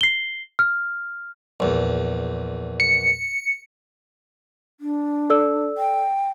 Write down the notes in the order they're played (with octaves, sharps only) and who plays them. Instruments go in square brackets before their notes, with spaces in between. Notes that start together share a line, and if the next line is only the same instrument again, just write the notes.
[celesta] C7 G7
F6
[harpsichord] A#1 E2
[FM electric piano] C#7
[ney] D4
[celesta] A4 D5 E6
[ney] G5